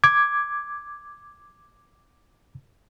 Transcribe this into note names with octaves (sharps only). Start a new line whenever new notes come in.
D6 G#6